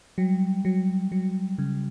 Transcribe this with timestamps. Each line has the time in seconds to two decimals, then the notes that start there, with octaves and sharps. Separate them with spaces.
0.18 F#3 G3
0.65 F#3
1.12 F#3
1.58 C#3